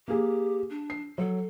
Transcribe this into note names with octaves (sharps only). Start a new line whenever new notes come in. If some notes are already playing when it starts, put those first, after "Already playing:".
A#3 G4 G#4
D4
C7
F#3 A4